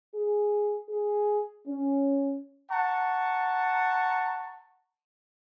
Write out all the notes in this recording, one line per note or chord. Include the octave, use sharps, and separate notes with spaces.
G#4
G#4
C#4
F#5 A5 A#5 C#6